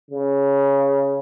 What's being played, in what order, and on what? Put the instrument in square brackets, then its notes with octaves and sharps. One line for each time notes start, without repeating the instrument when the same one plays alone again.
[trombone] C#3